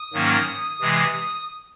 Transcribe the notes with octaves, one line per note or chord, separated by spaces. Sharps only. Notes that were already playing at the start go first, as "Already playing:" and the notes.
Already playing: D#6
G#2 D#3 F#3 A#3 C#4
C3 E3 G#3